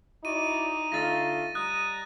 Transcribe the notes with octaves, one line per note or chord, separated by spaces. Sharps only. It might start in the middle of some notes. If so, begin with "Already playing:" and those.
D#4 E4 F#4 D5 D#7
D3 A3 F4 A6 A#6
G3 D#5 A#5 D#6 F#6